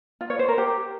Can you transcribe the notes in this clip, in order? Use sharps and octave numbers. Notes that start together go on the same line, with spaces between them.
F4
C#5
C5
A#4
G4